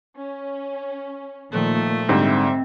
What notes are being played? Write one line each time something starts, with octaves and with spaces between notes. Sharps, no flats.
C#4
A#2 D#3 F3 A3
G#2 D3 G3 C4 E5